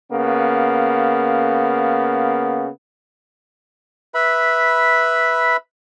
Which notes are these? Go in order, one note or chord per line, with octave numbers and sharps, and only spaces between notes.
C#3 A#3 B3
B4 E5 B5